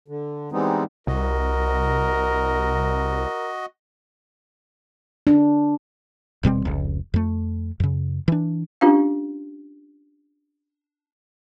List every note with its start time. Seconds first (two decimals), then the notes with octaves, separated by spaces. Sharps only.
0.08 D3
0.52 E3 G3 G#3 B3 C4 D#4
1.07 C2 F#4 A#4 D#5
5.27 D4
6.43 D#1 B2 G3 C4
6.65 F1 C#2
7.14 F2 A3
7.80 F#2 C#3
8.28 E3 D4
8.81 C#4 D4 F4 G4 F5